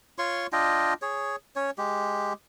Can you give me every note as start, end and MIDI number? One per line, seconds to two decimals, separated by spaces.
0.18 0.47 65
0.18 0.47 73
0.18 0.47 84
0.18 0.47 85
0.52 0.94 62
0.52 0.94 65
0.52 0.94 75
0.52 0.94 79
1.02 1.36 68
1.02 1.36 73
1.56 1.71 61
1.56 1.71 73
1.78 2.33 56
1.78 2.33 67